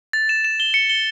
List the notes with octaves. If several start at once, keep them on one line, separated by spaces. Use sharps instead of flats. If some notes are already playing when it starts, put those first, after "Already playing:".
A6
E7
E7
G7
C#7
G7